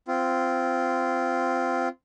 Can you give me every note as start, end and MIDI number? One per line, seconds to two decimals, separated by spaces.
0.08 1.88 60
0.08 1.88 65